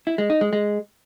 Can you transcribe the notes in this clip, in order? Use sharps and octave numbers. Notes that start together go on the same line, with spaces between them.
E4
G#3
D#4
G#3
G#3